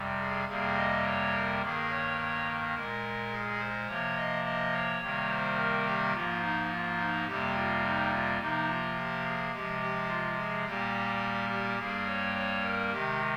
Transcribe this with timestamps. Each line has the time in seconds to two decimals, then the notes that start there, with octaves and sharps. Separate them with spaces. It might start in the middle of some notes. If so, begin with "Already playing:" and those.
Already playing: F2 C3 G3
0.20 G#4
0.48 F2 C3 G3 A#3 G#4
0.76 D#5
1.05 C#5
1.32 A#4
1.62 G2 D#3 A#3 G#4
1.90 C#5
2.18 C#5
2.75 A#2 G#3 A#4
3.31 G#4
3.59 C5
3.87 C3 F3 A#3 C#5
4.16 D#5
4.44 D#5
4.72 C#5
5.00 C3 D#3 G3 A#3
5.29 C5
5.56 A#4
5.86 G4
6.13 G#2 F3 A#3 F4
6.42 D#4
6.70 F4
6.98 D#4
7.26 F2 C3 G3 A#3 G4
7.54 F4
7.82 D#4
8.11 F4
8.39 C3 F3 A#3 D#4
8.68 F4
8.95 G4
9.24 G#4
9.52 C3 F3 G#3 G4
9.81 G4
10.08 F4
10.37 G#4
10.65 A#2 G3 A#3 G4
11.49 G4
11.78 G2 G3 A#3 G#4
12.06 C#5
12.35 C#5
12.62 A#4
12.91 C3 D#3 G#3 G4